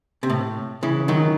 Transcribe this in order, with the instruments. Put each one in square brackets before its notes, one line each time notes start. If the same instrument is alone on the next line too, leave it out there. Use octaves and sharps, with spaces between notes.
[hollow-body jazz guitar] C3
A2
C#3 E3
D#3 F#3